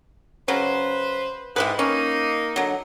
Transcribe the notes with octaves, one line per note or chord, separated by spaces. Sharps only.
C#3 F#3 B4 C5
G#2 E4 G4 B4
A#3 C#4 D#4
D3 F#3